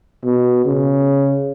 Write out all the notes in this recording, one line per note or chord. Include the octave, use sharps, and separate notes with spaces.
B2
C#3